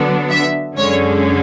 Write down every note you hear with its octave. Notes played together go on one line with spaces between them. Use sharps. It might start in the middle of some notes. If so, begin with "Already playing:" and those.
Already playing: D3 F#3 B3 D4
E5
F#2 D3 G#3 C#4 C#5